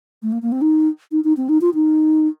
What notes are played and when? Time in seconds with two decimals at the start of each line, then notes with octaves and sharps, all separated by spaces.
0.22 A3
0.32 A#3
0.42 A#3
0.52 C4
0.61 D#4
1.12 D#4
1.24 D#4
1.37 C4
1.49 D#4
1.61 F4
1.74 D#4